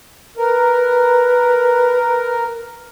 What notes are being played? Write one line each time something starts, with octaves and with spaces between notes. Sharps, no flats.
A#4 B4